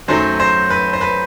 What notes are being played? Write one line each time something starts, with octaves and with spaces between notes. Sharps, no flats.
F#2 D#3 F#3 A3 C5
C5
B4
C5
B4